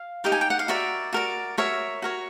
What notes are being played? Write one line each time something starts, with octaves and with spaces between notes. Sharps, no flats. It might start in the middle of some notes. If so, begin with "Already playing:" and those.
Already playing: F5
D#4 G4 A#4
G#5
G5
F#5
F5
F#4 A#4 D5 E5
F#4 A#4 D5
F#4 A#4 C#5 E5
F#4 A#4 C#5